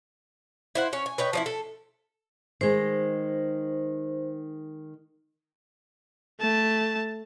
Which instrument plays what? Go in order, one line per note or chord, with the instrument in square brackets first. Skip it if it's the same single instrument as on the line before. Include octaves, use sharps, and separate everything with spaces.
[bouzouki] E4 C5 F#5
C#4 C#5
G#5
B4 C#5 D#5 G5
F3 C#4 E4
A4
[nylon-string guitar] D#3 G#3 [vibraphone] C5
[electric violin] A3 A5